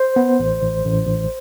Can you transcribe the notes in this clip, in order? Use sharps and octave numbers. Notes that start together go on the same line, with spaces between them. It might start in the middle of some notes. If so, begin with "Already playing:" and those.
Already playing: C5
B3
A1
A1
A1
A1